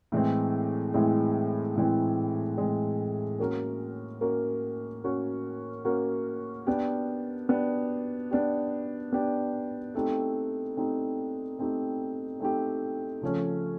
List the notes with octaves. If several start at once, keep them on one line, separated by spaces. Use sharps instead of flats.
A2 E3 G#3 C4
A2 E3 G#3 C4
A2 E3 G#3 C4
A2 E3 G#3 C4
A#3 C#4 F#4 A#4
A#3 C#4 F#4 A#4
A#3 C#4 F#4 A#4
A#3 C#4 F#4 A#4
B3 D4 G4
B3 D4 G4
B3 D4 G4
B3 D4 G4
A3 C4 D#4 G4
A3 C4 D#4 G4
A3 C4 D#4 G4
A3 C4 D#4 G4
C#3 F3 A3 C#4